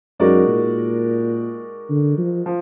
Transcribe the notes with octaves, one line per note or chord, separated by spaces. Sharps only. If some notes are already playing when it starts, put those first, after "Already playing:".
F#2 G#3 D#4 F#4 A#4 D5
A#2
D3
F3
F3